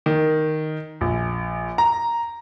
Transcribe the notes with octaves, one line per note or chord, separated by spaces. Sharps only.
D#3
A#1
A#5